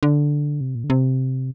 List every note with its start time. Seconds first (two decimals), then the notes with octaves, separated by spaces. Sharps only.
0.03 D3
0.61 C3
0.75 A#2
0.84 D3
0.90 C3